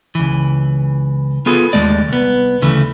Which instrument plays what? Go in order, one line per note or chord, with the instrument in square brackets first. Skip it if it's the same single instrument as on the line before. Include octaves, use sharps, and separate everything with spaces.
[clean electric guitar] C#2 E3
B3 F4 G#4 A4
D#2 C3 G#3 A3 D5
C2 B3
D2 C#3 E3 A3